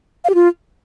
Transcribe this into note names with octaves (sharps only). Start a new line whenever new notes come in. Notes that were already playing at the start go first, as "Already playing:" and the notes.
F5
G4
F4